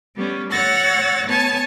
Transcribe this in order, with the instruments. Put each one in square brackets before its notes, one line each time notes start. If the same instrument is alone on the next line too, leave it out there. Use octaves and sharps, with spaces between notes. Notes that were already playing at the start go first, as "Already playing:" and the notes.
[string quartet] G3 B3 C#4
C#5 F#5 E6 A6 A#6
B3 C#5 G#5 A5